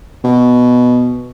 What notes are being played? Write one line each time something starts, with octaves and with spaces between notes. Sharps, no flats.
B2